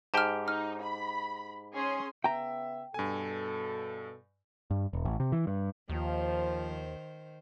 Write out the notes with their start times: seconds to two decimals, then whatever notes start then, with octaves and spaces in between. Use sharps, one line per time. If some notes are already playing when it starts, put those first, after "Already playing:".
0.14 G#2 G4 G5 A5 F6
0.48 D#4 F6
0.82 B5
1.75 C#4 G#4 C6
2.24 C#3 B3 E5 G5 A#5
2.94 G2 B2 A4 G#5
4.71 G2
4.93 E1
5.05 A1
5.20 C3
5.32 E3
5.47 G2
5.89 D#2 D#3 F3 C5